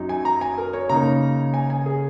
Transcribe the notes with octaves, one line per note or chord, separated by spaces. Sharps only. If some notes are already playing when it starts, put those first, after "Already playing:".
Already playing: F#2 F#3 D#4
G#5
A#5
G#5
A#4
C#5
C#3 A#3 D#4 A#5
G#5
G#5
G#4